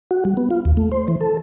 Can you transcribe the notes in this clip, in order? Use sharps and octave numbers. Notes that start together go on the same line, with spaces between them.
F#4
G3
B3
F4
D#2
A3
C5
E3
A4